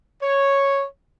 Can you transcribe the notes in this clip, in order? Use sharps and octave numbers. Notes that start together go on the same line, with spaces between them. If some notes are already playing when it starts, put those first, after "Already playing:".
C#5